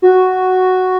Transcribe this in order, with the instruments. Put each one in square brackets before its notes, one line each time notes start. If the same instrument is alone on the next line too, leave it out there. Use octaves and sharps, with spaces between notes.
[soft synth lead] F#4